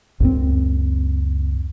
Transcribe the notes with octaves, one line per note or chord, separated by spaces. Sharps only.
C#2 F#2 C4